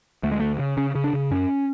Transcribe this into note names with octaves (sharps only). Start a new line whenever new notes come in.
D2 A3
G#3
D2 A3
C#3
C#3 C#4
C#3
D4
C#3
F#2 C#4